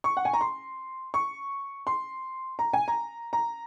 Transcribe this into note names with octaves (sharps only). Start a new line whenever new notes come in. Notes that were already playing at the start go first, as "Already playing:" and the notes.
C#6
F#5
G#5
A#5
C6
C#6
C6
A#5
G#5
A#5
A#5